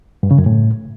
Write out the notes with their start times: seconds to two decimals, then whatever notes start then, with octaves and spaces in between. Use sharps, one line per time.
0.23 G2
0.31 C#3
0.38 F#2
0.46 A2